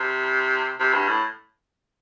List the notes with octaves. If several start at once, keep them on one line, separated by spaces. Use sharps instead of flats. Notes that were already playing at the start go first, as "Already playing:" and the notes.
Already playing: C3
C3
G2
A2